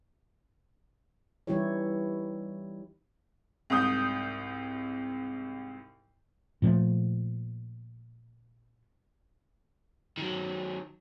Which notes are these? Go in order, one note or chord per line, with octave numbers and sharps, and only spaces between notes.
E3 G3 D#4 E4 G4 C#5
C2 G#2 D#6 G6
A#2 F3 A3
D#3 F#3